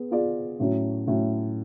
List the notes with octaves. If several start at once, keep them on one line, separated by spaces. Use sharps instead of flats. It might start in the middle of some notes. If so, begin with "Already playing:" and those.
Already playing: B3 G#4
B3 F4 G#4 D5
A2 F#3 C#4
A2 F#3 C#4